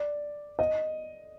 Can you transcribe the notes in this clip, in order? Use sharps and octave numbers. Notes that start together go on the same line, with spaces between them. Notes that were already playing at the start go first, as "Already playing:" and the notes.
Already playing: D5
D#5